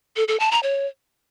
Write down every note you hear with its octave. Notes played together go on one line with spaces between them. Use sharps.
A4
A4
A5
A#5
C#5